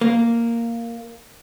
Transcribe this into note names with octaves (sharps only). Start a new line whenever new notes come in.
A#3